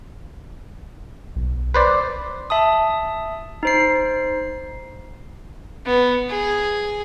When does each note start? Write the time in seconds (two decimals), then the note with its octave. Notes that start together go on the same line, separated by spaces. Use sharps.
1.36 B1
1.74 B4 C5 D5
2.50 E5 A5 D#6
3.63 D#4 C5 C7
5.86 B3
6.30 G#4